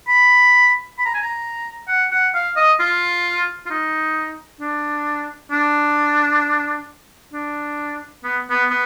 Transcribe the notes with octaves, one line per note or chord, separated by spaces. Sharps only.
B5
B5
A#5
G#5
A#5
F#5
F#5
F5
D#5
F4
F4
D#4
D4
D4
D4
B3
B3
B3